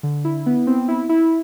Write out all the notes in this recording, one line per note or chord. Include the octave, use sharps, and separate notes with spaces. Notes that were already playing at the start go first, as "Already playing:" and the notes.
D3
E4
B3
C4
E4
E4